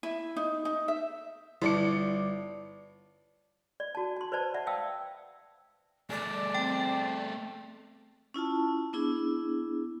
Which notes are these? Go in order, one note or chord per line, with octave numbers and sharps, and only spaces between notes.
E4
D#4
D#4
E5
G1 G3 E4 D5 C#7
D5
F#4 A5
A5 C6
B4 C5 D5 A5
D5 E5 F#5 A5
E5 F5 G5 A5 D#6 E6
A3 G#4 D5
C4 C5 G5
C#4 E4 F4 A5
B3 D4 E4 G#4